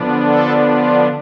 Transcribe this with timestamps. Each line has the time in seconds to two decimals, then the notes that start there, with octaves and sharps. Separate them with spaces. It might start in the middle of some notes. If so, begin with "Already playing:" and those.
Already playing: D3 F3 B3 D4
0.23 A4
0.65 F4